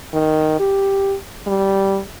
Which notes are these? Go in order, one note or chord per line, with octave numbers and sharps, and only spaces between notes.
D#3
G4
G3